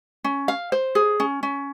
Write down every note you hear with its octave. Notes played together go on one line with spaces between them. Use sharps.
C#4
F5
C5
G#4
C#4
C#4